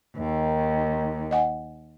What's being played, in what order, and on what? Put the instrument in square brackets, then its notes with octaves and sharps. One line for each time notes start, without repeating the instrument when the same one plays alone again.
[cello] D#2 [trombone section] D#3
[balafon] D#5 F#5 G#5